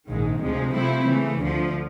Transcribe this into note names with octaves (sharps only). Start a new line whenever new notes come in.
A#1 G#2 D#3 G#3
D2 C3 F3 G#3
C3 F3 A3 C4 E4
C#3 E3 A3
D2 D3 F3